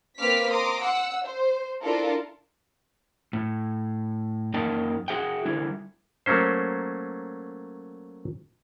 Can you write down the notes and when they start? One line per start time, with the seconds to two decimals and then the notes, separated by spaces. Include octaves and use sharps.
0.19 A#3 C4 B4 D6 F6 B6
0.51 A#5 C6 D6 D#6
0.82 F#5 E6
1.24 C5
1.82 D4 E4 F4 A4 A#4
3.33 A2
4.54 F#2 A#3 D#4 G5 A5
5.08 F#4 G#4 E5 G5
5.45 D3 G3 E4
6.26 F#3 A3 A#3 C#4 C5